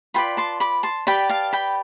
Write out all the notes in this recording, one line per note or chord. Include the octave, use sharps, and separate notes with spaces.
F4 B4 D5 G5 B5
A5 C6
B5 D6
A5 C6
G4 B4 D5 G5 B5
F5 A5
G5 B5